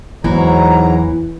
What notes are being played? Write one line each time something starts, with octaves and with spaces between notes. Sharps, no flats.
E2 G#2 E3 F#3 A#5